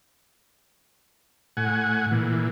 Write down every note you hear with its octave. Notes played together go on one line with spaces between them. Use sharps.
A2 F#5 G#5
A#2 E3